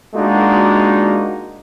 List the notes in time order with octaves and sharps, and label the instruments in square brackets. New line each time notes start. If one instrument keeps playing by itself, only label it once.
[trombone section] G#3 A#3 D4 D#4 F4 F#4